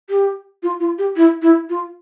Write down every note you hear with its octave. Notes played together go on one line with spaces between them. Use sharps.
G4
F4
F4
G4
E4
E4
F4